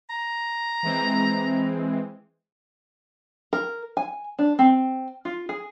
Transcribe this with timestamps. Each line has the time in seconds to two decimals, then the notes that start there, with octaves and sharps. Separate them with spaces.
0.10 A#5
0.83 E3 G#3 C4
3.53 A#4
3.97 G#5
4.39 D4
4.59 C4
5.25 F4
5.49 G#4